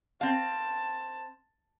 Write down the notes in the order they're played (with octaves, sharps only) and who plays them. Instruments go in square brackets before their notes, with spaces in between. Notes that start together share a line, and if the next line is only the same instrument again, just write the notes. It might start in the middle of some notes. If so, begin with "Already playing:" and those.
[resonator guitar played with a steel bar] C4 F5 [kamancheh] A5